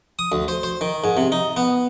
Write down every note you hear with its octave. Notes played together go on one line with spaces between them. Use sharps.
D#6
D2
C5
C5
D#3
G#2
C3
D#4
B3